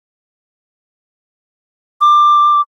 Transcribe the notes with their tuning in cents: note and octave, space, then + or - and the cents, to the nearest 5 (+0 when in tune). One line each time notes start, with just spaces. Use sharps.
D6 +15